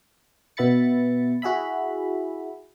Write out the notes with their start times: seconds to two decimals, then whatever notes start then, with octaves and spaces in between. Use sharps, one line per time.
0.57 B2 B3 E5 B5 A6 C#7
1.42 E4 F#4 G#4 E5 B5